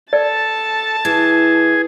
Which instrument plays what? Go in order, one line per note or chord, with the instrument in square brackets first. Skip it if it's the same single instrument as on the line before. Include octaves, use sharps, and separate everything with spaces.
[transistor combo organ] A4 [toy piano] D5 [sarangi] A5
[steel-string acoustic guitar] E3 [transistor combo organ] G#4